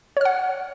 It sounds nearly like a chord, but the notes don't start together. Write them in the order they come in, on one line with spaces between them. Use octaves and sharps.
C#5 F6 F#5